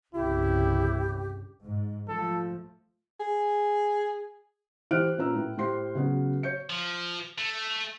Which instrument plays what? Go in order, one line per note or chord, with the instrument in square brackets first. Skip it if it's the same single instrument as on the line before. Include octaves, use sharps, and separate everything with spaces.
[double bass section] C2 G2 C#3 [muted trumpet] E4 [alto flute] G4
[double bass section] G#2
[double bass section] F3 A3 [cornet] A4
[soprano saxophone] G#4
[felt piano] E3 G4 C5 F6 F#6 D7
A#2 C#4 B4 A#5 E6
A2
A2 G4 C5 C6 C7
C#3 F#3 B3 C#4 F#4
C#5 G6 C#7
[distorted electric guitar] F3
A3